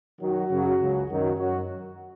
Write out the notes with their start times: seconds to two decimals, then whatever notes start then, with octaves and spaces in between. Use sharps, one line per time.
0.20 F#2 D#3 F#3 F#4
0.50 F#2 C#3 F#3
0.79 C#2 C#3 F#3
1.09 F#2 D#3 F#3
1.39 F#2 F#3 F#4